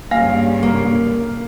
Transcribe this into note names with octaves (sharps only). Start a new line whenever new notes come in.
G2 C#3 A#3 F5
C3 A#3